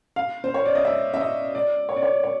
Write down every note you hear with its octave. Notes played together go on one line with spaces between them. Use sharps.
F5
C5
C#5
D5
D#5
E5
E5
D#5
D5
C#5
D5
C#5
C#5